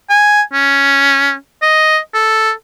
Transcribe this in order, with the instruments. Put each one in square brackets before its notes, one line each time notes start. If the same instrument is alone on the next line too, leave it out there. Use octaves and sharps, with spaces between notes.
[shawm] G#5
C#4
D#5
A4